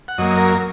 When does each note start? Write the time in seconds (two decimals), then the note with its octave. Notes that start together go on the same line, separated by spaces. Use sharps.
0.08 F#5
0.18 F#2 F#3 A#3 D#5
0.37 A#4